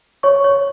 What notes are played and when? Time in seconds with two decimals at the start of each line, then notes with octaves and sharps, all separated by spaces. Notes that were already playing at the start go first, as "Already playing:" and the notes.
0.23 C#5 C#6
0.44 C#5